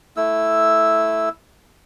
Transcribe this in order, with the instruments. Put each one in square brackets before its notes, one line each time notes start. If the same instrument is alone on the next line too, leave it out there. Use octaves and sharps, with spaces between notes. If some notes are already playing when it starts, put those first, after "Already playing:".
[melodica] A3 E4 E6